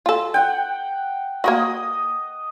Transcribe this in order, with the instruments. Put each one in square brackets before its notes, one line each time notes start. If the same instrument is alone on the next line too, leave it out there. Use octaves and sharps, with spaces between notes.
[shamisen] F4 A4
[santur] F#5 G5
[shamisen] A#3 F#4 [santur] D#5 D#6